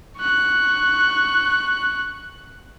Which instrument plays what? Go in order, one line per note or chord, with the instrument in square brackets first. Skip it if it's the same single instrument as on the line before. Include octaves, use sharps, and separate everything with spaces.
[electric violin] C#6 F#6